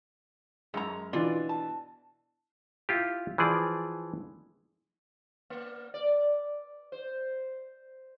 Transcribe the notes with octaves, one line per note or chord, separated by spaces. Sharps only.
F#2 G#3 A#5
B2 E3 D4 F4 D5
A5
E4 F4 G4
E3 F3 G#4 D5
A#3
D5
C5